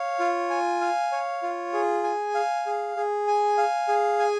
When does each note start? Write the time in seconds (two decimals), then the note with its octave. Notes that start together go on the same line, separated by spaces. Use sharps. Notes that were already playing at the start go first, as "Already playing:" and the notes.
Already playing: C#5 F5
0.19 F4
0.50 G#5
0.81 F5
1.12 C#5
1.43 F4
1.73 G#4
2.04 G#5
2.35 F5
2.66 G#4
2.96 G#4
3.27 G#5
3.58 F5
3.88 G#4
4.19 G#5